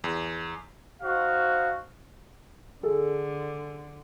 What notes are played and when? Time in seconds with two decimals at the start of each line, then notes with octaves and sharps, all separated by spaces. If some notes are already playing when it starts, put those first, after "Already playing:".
0.04 E2
1.02 D#4 F#4 C5 F5
2.83 D3 G#4 A4